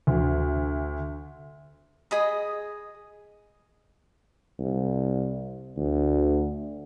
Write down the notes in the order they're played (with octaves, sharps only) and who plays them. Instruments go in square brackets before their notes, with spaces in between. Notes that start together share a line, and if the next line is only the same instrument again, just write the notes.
[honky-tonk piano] D2
[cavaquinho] G#4 D#5 B5
[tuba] C2
D2